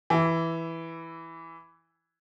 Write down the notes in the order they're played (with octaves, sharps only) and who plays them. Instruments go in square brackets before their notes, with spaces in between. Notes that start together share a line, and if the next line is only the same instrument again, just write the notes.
[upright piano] E3 E4